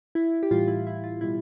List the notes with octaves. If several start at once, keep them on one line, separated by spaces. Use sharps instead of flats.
E4
G4
A2 E3 G3 F4
E4
E4
F4
B2 G3 E4